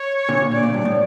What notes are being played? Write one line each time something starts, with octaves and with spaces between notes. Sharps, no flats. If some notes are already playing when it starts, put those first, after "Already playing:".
Already playing: C#5
A#2 D3
A#2 D5
A#2
G2
A2